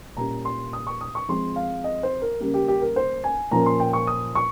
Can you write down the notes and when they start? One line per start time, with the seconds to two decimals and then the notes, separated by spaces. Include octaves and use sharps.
0.17 A#2 G3 C#4 A#5
0.45 C6
0.73 D#6
0.87 C#6
1.01 D#6
1.15 C#6
1.28 F3 G#3 C4 C6
1.56 F5
1.84 D#5
2.03 C5
2.22 A#4
2.40 C#3 G3 A#3
2.54 G4
2.68 G4
2.82 A#4
2.96 C5
3.24 G#5
3.51 A#2 F3 A#3 C#4 A#5
3.66 C6
3.80 G5
3.93 C#6
4.07 D#6
4.35 C#6